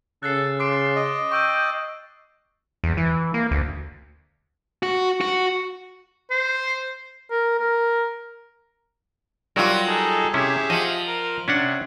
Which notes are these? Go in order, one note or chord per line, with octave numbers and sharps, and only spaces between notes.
C#3 A4 F#6 A6 C7
C6 D6 D7
D#5
G5 C#6 E6 G6
E2
E3
A#3
D2
F#4
F#4
C5
A#4
A#4
F#3 G3 F4 F#4 A#4
D#4 G#4 A4
C3 C#4 E4 G4 G#4 E5
F3 D#5 F#5
A#4
C3 C#4 D4 F#5